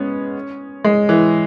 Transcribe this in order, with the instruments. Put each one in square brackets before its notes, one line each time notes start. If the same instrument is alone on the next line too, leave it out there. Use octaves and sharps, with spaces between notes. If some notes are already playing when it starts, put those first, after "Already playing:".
Already playing: [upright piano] G#3 B3 C#4
G#3
E3